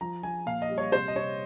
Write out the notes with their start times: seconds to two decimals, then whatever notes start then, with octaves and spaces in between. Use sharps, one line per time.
0.01 F3 A#5
0.23 F3 G#5
0.46 A#2 F5
0.62 D#5
0.70 G3
0.78 C#5
0.92 C3 C5
1.08 D#5
1.16 C3 C#5